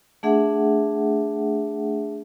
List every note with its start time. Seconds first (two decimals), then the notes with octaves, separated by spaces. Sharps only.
0.23 A3 D4 G#4 E5 F#5